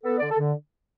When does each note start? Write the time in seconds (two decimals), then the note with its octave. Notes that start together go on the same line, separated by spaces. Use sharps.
0.04 B3 A4
0.18 D3 D5
0.31 A4
0.39 D3